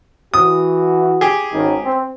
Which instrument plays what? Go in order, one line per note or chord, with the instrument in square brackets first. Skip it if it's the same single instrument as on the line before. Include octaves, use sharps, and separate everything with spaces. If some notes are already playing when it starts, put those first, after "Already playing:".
[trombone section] E3 F#4 [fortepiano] D#6
[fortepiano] G4 G#4
[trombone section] G#1 D#3 C#4
C4